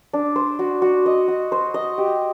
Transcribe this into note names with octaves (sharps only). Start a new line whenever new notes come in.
D4
C5
F#4
F#4
D#5
F#4
C5
D#5
G4